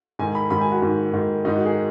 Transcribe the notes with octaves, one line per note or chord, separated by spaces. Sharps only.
G#2 D#3 G#5
B5
G#2 D#3 B5
G#5
F#4
G#2 D#3
G#2 D#3
G#2 D#3 D#4
F#4
G#4